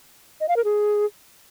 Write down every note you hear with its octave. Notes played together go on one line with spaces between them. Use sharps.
D#5
F5
A#4
G#4